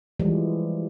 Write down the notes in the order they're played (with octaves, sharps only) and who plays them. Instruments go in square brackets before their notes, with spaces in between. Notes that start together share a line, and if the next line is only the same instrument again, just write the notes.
[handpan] E3 F3 G3 G#3